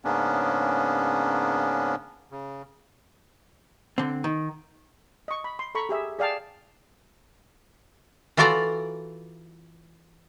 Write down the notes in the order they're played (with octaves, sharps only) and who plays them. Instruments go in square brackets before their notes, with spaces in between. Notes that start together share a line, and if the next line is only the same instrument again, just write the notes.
[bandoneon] G#2 C#3 A#3 B3 C#4 D4
C#3
[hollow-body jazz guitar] D3 C4
D#3
[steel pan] D#5 C#6
B5
C6
A4 A#5 B5 C#6
G4 G#4 E5
G#4 D5 F5 G5 A5
[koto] E3 F4 F#4 A4 D5 A#5